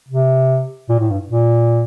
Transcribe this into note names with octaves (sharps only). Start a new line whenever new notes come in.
C3
A#2
A2
G2
A#2